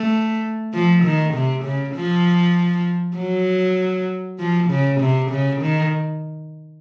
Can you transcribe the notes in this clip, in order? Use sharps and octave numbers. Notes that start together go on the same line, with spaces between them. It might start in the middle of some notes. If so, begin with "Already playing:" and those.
Already playing: A3
F3
D#3
C3
C#3
F3
F#3
F3
C#3
C3
C#3
D#3